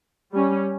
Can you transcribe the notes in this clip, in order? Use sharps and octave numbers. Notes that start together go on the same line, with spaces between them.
G3 C#4